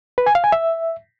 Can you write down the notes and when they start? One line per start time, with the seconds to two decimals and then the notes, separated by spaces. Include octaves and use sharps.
0.18 B4
0.26 G#5
0.35 F5
0.44 G#5
0.52 E5